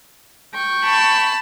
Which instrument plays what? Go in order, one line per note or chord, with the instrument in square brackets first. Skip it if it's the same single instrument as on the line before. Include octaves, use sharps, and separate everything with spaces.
[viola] G5 C#6
[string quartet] A5 B5